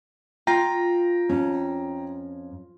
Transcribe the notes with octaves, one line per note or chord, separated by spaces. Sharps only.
F4 G5 A#5 A#6
F2 C#4